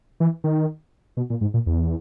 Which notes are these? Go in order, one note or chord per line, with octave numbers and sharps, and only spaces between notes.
E3
D#3
B2
A#2
G#2
A#2
E2